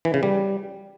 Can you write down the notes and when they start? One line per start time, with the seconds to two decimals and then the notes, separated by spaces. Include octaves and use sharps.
0.05 E3
0.14 C#3
0.23 G3